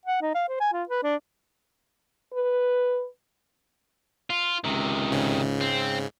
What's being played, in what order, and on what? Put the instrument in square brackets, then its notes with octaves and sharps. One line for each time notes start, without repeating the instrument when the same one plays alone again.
[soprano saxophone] F#5
D#4
F5
C5
G#5
F4
B4
D4
[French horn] B4
[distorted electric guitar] F4
[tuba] C#2 [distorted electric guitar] C3 D#3
[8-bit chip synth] G#2 C#3
[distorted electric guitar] C4